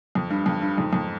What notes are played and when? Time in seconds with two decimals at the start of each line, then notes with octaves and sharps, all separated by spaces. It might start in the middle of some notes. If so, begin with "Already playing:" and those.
0.15 F2
0.30 G2
0.46 F2
0.62 G2
0.77 F2 G#2
0.93 F2 G#2